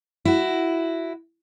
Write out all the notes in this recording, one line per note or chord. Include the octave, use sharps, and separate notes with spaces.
E4 F#4